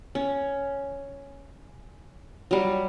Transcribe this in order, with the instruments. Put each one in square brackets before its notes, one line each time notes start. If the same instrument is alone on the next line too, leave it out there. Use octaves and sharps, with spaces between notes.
[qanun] C#4
F#3 G3